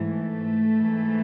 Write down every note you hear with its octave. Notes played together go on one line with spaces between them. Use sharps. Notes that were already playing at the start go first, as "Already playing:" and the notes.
Already playing: G#2 E3 A3
G#2 E3